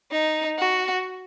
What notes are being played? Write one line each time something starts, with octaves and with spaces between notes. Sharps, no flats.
D#4
F#4